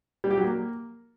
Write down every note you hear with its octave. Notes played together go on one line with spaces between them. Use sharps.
G3
G4
F#3
A#3